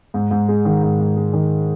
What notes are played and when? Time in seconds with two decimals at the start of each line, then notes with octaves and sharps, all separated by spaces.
0.14 G#2
0.31 G#2
0.49 G#3
0.65 D#3
0.83 G#2
0.99 G#2
1.16 G#3
1.33 D#3